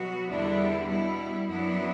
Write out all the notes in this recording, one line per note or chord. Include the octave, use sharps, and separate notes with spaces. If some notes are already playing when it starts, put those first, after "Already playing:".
Already playing: B2 F#3 B3 F#4
E2 D3 G3 B3 D4 E4
B2 G3 B3 E4
F#2 F#3 B3 D4 E4